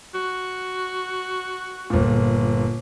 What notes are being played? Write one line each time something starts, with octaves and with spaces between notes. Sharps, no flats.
F#4
G1 A#2